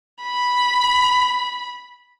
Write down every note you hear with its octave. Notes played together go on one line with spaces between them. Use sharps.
B5